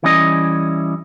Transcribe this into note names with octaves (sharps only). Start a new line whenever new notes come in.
E3 G3 C#4 D#5